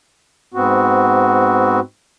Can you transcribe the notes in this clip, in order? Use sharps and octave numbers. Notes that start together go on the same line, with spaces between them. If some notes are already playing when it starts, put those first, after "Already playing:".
G#2 B3 C4 F#4